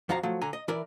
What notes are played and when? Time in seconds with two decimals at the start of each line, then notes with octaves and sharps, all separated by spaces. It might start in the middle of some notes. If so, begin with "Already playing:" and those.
0.09 F2 F3 F#4 F5 A#5
0.23 F3 F#3 A3
0.41 D3 G#5 A#5
0.53 D#5
0.68 E3 E4 A#4 D5